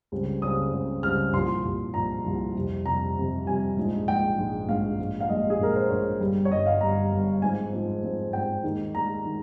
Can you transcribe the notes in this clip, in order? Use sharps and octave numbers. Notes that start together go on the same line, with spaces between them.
C#2 C#3 G3 C4
C#2 C#3 G3 C4 D#6
C#2 C#3 G3 C4
C#2 C#3 G3 C4 F6
C2 A#2 F3 C6
C2 A#2 F3
C2 A#2 F3 A#5
C2 A#2 F3
F2 C3 G3
F2 C3 G3 A#5
F2 C3 G3
F2 C3 G3 G#5
A#1 G#2 F3 G#3
A#1 G#2 F3 G#3 G5
A#1 G#2 F3 G#3
A#1 G#2 F3 G#3 F5
A#1 A#2 G#3
F5
A#1 A#2 G#3 D#5
G#4
A#1 A#2 G#3 A#4
C5
A#1 A#2 G#3 C#5
G1 G2 G3
C#5
G1 G2 G3 D#5
F5
G1 G2 G3 A#5
G1 G2 G3
G#2 F3 C4 G#5
G#2 F3 C4
G#2 F3 C4
G#2 F3 C4 G5
D#2 D#3 G#3
D#2 D#3 G#3 A#5
D#3 G#3